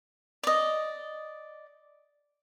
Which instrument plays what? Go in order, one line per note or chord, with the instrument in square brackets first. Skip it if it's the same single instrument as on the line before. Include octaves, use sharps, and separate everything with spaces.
[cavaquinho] D5 D#5